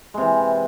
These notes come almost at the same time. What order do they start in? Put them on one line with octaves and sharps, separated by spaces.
G#3 C3 E3